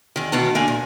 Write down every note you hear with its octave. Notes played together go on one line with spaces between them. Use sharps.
E2 D#3
D2 B2 D#3 A#3 B3 A5
D2 A#3 D4 G#5
A#2